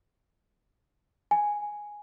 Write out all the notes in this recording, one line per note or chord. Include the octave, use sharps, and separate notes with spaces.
G#5